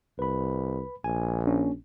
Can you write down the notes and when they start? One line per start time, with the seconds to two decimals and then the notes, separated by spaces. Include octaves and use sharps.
0.19 C2 B4 B5
1.04 A#1 G#5
1.47 A#3 C#4 D4